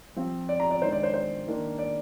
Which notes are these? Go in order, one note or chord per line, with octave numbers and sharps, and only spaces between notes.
F3 C4
D5
A#5
D5
D#3 G#3 D4 C5
D5
C5
C5
D#3 A#3 D4
D5